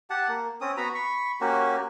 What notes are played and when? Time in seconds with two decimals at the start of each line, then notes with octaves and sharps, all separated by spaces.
0.10 G4 F#5 A5
0.28 A#3
0.61 C4 C#4 D#6
0.77 B3 F#4 A#5 B5
0.94 B5 C#6
1.41 A#3 C#4 F#4 G4